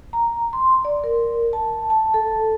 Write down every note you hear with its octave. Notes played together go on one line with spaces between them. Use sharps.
A#5
C6
D5
A#4
A5
A5
A4